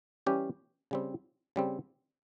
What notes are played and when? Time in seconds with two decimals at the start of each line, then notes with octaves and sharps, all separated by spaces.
0.26 E3 G3 C#4 G4
0.91 C#3 G3 C4
1.56 C#3 G3 C4